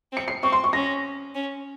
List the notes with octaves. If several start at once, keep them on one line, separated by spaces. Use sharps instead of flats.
C4
C#7
C7
C4 C#6
C6
C#6
C#4 A#6
C#4